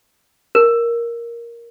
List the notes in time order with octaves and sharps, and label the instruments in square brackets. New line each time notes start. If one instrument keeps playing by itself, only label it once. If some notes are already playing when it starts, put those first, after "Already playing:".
[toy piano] A#4